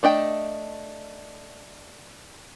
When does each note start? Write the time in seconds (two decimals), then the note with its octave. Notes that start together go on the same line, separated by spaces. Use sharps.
0.03 A3 D4 D#5 G5